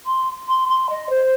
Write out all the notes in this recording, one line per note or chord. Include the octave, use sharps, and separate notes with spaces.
C6
C6
C6
D#5
C5